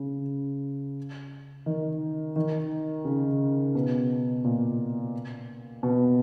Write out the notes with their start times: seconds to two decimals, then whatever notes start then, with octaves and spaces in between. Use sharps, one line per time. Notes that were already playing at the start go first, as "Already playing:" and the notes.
Already playing: C#3
1.66 D#3
2.36 D#3
3.05 C#3
3.75 B2
4.44 A#2
5.83 B2